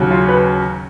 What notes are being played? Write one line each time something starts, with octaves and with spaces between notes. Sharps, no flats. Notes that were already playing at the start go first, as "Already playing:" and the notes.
Already playing: D#2 C#3 F#3 C#4
F4
B4